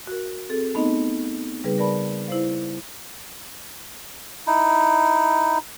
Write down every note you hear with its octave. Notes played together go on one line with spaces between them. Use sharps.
F#4 A#4
C4 G#4 A4
A3 B3 C4 D#4 D#5
C#3 G3 D#4 G#4 B4
A#4 B4 D5 A5 B5
E4 C5 F5
D#4 E4